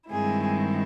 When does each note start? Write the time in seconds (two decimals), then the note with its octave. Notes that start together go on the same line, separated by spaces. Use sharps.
0.10 G2 D#3 G#3 C4 E4 G#4